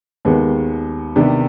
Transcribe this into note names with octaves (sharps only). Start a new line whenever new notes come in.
D#2 D#3 G#3 B3
C3 D#3 B3 D4 G4